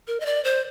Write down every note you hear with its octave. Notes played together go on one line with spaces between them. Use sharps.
A#4
D#5
D5
C5